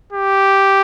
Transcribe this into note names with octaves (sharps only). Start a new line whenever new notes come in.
G4